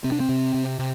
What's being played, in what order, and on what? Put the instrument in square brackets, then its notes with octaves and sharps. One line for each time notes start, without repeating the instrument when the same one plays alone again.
[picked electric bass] C3 C4
D4
C4
C3
C3
C3